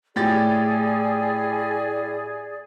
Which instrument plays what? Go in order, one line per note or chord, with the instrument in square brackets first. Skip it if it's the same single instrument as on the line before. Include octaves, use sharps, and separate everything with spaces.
[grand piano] A2 G4 A6 [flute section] G#4 D5